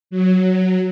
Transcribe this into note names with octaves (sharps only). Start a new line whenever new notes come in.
F#3